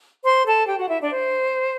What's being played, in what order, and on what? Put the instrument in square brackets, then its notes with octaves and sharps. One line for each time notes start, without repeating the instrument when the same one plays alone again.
[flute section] C5 C6
A4 A5
G4 G5
F#4 F#5
E4 E5
D4 D5
C5